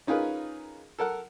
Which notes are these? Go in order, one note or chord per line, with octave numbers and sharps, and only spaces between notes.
C#4 D#4 F4 G#4 A#4 B4
A4 A#4 F#5